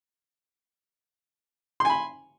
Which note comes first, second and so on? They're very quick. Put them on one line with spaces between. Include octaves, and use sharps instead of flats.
C6 G#5 B5